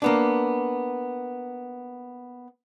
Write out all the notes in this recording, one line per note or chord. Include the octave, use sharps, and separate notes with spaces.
A#3 B3 D4